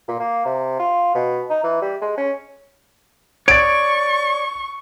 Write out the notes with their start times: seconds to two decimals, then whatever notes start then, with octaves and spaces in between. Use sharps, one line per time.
0.08 A#2
0.19 A#3
0.45 C3
0.79 F4
1.15 B2
1.50 D#4
1.63 E3
1.82 G3
2.01 G#3
2.18 C#4
3.48 C#5 D5 C#6 D7